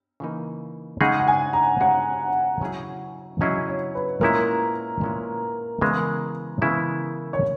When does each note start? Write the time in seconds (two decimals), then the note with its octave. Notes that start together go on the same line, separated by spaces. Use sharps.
0.20 C#3 E3 A#3 D#4
1.01 C#3 G#3 D#4 G#4 F#5
1.19 F#5
1.28 G#5
1.53 A#5
1.80 C#3 G#3 D#4 G#4 F#5
2.61 C#3 F#3 C#4 E4 G#4
3.41 C#3 F#3 C#4 E4 G#4 D#5
3.68 C#5
3.95 B4
4.21 A#2 G#3 C#4 E4 A#4
5.01 A#2 G#3 C#4 E4
5.81 C#3 E3 G#3 B3 E4 A#4
6.62 C#3 E3 G#3 B3 E4
7.33 C#5